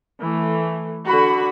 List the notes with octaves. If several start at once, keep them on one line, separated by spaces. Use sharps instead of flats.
E3 A3
D3 F#4 B5